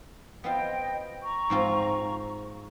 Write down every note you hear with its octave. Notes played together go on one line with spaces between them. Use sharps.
B3 C4 F4 D#5 G5
A#5 C#6
G#2 C4 F4